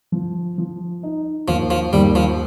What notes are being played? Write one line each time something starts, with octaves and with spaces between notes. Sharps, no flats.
F3
F3
D#4
D#2 F3
F3
D#2 G3
F3